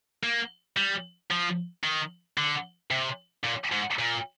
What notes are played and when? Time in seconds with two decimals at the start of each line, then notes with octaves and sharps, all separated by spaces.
0.23 A#3
0.77 G3
1.31 F3
1.84 D#3
2.37 D3
2.91 C3
3.44 A#2
3.72 G#2
3.99 A#2